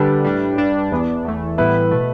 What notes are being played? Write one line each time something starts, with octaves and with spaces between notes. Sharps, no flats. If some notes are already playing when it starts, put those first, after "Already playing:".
Already playing: D3 G3 D4 G4 A4 B4
A2 G3 D4
G2 G3 D4
E2 E3 B3 D4
E2 E3 A3
A2 E3 G3 B3 E4 B4
B2 A3